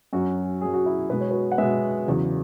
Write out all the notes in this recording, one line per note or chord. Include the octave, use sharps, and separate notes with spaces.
F#2 F#3 C#4 F#4
F#2 F#3 G#4
F#4
E4 G#4
B2 G#3 B4
C#5
F#4 B4
F#5
B2 G#3 B4 E5
E2 C#3 F#3